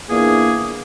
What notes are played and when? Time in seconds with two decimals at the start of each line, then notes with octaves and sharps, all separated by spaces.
0.10 E2 A#2 A#3 D4 G#4